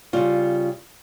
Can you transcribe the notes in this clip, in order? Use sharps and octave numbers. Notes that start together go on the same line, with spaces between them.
C#3 G3 F4